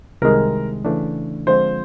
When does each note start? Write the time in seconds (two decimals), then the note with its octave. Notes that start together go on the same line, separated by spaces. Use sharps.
0.22 C2 C3 D#3 G#3 A#4
0.85 C#3 E3 A3 D4
1.47 D3 F3 G#3 C4 F4 C5